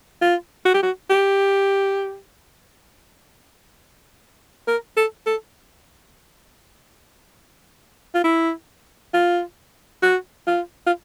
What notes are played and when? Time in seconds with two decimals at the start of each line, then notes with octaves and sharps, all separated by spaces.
0.22 F4
0.66 F#4
0.74 G4
0.83 F#4
1.10 G4
4.67 A#4
4.97 A4
5.26 A4
8.15 F4
8.24 E4
9.14 F4
10.03 F#4
10.47 F4
10.86 F4